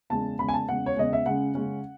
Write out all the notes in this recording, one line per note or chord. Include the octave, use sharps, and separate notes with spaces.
E2 C#3 G#3 A5
E2 C#3 G#3 B5
G#5
A5
E2 C#3 G#3 F#5
C#5
E2 C#3 G#3 D#5
E5
C#3 G#3 C#4 F#5
C#3 G#3 C#4